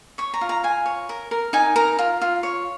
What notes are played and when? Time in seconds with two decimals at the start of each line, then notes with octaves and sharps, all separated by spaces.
0.18 C#5 C#6
0.34 A#5
0.41 F4
0.49 A#5
0.63 F4 G#5
0.86 C#5
1.09 A#4
1.31 A#4
1.53 D#4 G#5
1.76 A#4 A#5
1.99 F4
2.21 F4
2.43 C#5